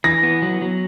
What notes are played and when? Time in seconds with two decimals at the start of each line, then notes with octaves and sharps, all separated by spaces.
0.04 E3 A#6
0.23 B3
0.42 F#3
0.62 F#3